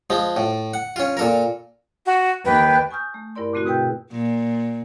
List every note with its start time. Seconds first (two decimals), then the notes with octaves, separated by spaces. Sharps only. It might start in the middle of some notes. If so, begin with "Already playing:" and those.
0.10 F3 G#3
0.37 A2
0.74 F#5
0.96 C#4 F4
1.17 A#2 A4 A#4
2.06 F#4
2.45 D#2 B4 G5
2.91 G#5 C#6 D#6 F6 G6
3.14 A3
3.35 G2 E4 A#4 D5 C6
3.53 A#2 D3 A3 C4 E4 F#4
3.66 B2 G#4 B4 G5 E6 G6
4.11 A#2